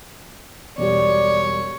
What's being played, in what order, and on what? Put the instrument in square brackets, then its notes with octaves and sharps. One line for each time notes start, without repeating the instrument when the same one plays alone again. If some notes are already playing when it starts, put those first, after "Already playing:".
[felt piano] E1 G3 [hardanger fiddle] C#5 [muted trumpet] D5